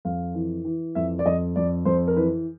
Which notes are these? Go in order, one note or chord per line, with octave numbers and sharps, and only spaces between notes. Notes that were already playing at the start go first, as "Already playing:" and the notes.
F2 F5
E3
E3
F2 E5
D5
F2 D#5
F2 D5
F2 C5
A#4
E3 B4